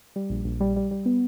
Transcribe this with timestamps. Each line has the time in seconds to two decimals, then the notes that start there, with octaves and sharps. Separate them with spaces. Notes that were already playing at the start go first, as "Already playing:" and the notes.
0.16 G3
0.30 A#1
0.45 A#1
0.60 G3
0.76 G3
0.91 G3
1.05 B3